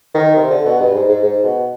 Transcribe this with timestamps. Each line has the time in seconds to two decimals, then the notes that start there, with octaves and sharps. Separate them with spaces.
0.14 D#3
0.36 C3
0.50 D3
0.66 B2
0.80 G2
0.94 G#2
1.09 G#2
1.23 G#2
1.44 B2